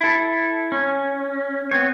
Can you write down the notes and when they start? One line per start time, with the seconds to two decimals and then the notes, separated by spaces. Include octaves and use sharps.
0.01 E4 A4
0.72 C#4
1.71 B3 C4 C#5